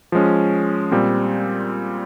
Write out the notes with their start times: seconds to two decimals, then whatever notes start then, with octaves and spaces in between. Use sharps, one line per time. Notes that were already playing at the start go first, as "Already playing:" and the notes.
0.12 F3 G#3 C#4
0.92 A#2 G3 C4